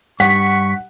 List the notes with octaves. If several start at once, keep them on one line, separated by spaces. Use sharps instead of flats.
G2 F#5 C#6 B6